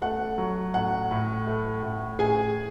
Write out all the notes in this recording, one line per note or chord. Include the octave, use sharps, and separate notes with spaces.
A3 F#5
F#3
A2 F#5
A2
A3
A2
A2 G#4 G#5